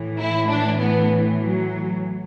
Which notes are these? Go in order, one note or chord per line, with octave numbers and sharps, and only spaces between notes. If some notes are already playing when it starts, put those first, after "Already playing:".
Already playing: A2 E3
E4
D4
B3
F#3